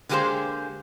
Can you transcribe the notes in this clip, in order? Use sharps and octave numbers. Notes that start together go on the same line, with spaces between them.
D3 G#3 A#3 G4 G#4 C5